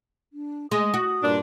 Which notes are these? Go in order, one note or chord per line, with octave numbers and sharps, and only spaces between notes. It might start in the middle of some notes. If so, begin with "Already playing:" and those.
D4
G#3 D#6
F#4
G2 A#2 D4